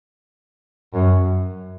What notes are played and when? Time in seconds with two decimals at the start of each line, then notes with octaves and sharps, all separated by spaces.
0.94 F#2